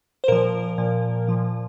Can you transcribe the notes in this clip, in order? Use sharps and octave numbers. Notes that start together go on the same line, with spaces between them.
C5
A#2 F3 A#4
A#2 F3
A#2 F3